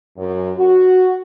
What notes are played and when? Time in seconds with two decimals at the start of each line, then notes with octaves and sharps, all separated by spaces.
0.18 F#2
0.57 F#4